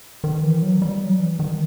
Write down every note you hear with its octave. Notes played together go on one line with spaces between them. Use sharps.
D#3
E3
F#3
G3
F#3
E3
D#3